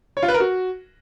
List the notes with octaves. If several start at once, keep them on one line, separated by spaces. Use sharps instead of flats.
C#5
F4
B4
A#4
F#4